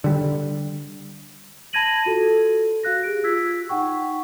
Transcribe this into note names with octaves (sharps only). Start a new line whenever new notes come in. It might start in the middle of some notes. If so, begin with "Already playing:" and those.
D3 G3
A5 B5 G#6 A#6 D#7 F#7
F4 F#4 A4
F#4 F5 F#6 A#6
G4 G#4 D7
F4 E6 G#6 B6
D#4 F#5 G5 C#6